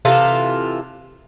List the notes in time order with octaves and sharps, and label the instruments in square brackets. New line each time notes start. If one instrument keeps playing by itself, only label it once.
[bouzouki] C3 E3 F4 A4